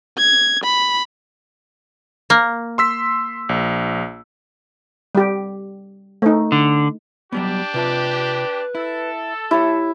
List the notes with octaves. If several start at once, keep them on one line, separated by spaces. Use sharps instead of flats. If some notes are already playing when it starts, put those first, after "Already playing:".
G#6
B5
A#3
C6 E6 B6
A#1
G3 G4
A3 D#4
D3
F#3 G3 B3 D4 G4
C3 F4 B4 A5
E4 A4
E4 G4 C#5